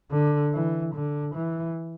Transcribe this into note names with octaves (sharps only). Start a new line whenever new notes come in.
D3
E3
D3
E3